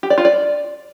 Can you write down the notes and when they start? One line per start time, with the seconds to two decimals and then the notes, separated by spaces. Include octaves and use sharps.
0.03 G4
0.10 D5
0.18 F4
0.25 D5